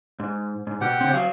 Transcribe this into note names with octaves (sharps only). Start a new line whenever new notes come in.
G#2
G#2
B2 G4 F#5 G5
C#3 C4
F#3 F5